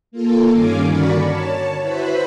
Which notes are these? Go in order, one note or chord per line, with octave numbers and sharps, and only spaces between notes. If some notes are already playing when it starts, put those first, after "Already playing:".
A#3 F4 A4
G2 D#3 C#4 F5 G#5 D6
D3 F#4 A#4 D5 B5 C#6
C#5 A5
E4 F#4 B4 C5 B5